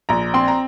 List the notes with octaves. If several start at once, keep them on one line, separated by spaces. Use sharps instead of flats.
A#1 A#5
C4 C6
A#5